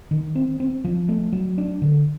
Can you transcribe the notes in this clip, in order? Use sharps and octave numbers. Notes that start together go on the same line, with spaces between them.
D#3
C4
C4
F3
A3
F#3
D4
D3